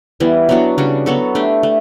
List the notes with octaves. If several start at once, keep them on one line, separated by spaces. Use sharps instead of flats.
E3 G3 B3
F#3 B3 D4 F#4
C#3 G3 D4 F#4
F#3 B3 F#4 A4
A3 D4 G4
A3